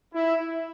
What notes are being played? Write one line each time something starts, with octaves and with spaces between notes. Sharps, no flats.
E4